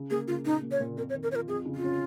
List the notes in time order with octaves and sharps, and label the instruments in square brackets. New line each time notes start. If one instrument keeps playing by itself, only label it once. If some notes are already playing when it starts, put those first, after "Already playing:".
Already playing: [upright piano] C#3
[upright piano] A#3 [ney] G#4
[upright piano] C#3 [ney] F4
[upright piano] A#2 [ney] D#4
[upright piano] A#3
[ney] C#5
[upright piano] A#2
[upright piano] F2 [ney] A#4
[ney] C#5
[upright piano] D#3
[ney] A#4
[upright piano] F4 [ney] C#5
[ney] A#4
[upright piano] F2 [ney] G#4
[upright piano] C#3
[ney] F4
[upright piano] C#4